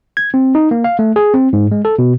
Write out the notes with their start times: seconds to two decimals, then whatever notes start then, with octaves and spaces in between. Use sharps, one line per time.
0.17 G#6
0.34 C4
0.55 D#4
0.71 A#3
0.84 F5
0.99 A3
1.16 G#4
1.34 C4
1.53 G#2
1.71 G#3
1.85 A4
1.99 B2